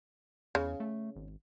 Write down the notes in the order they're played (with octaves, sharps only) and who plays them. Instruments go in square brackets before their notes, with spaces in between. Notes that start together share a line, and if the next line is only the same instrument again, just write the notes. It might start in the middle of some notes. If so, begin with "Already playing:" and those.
[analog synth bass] E2 [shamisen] C#3
[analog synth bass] A3
G#1